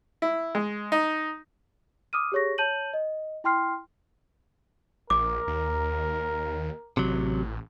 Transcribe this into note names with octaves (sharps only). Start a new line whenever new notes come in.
E4
G#3
D#4
D6 D#6 F6 D#7
G4 G#4 C#5 C#6 A#6
C#5 A5 G6 D#7 F#7
D#5
E4 G5 C6 F6 C7
A#1 A#4 D6
D#2
A1 C3 F#3